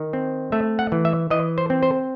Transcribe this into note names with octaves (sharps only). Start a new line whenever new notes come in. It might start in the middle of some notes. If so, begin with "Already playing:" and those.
Already playing: D#3
C4
A3 E5
F#5
E3
E5
E3 D#5
C5
C4
C5